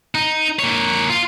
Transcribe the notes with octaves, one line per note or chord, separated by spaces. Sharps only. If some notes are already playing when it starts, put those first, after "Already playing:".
D#4
A#3 C#5
F4